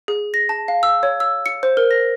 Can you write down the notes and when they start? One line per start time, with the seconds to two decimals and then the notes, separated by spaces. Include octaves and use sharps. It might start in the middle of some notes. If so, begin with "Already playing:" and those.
0.08 G#4
0.34 A#6
0.49 A5
0.68 F5
0.83 E6
1.03 C#5
1.20 E6
1.46 C#7
1.63 C5
1.77 A#4
1.91 A#6